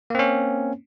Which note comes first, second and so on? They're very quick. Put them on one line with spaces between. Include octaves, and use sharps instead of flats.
A#3 C4 C#4